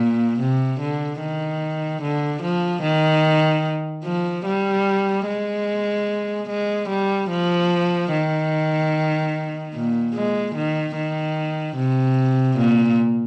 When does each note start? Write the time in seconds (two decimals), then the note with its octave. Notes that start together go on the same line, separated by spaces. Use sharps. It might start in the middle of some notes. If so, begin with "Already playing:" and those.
Already playing: A#2
0.39 C3
0.80 D3
1.20 D#3
2.02 D3
2.43 F3
2.83 D#3
4.04 F3
4.45 G3
5.26 G#3
6.49 G#3
6.89 G3
7.30 F3
8.11 D#3
9.74 A#2
10.14 G#3
10.55 D#3
10.96 D#3
11.76 C3
12.58 A#2